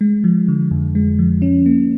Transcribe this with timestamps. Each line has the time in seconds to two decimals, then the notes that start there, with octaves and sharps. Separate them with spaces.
0.01 G#3
0.24 F3
0.48 D3
0.71 F2
0.95 G#3
1.19 F3
1.42 C#4
1.66 A#3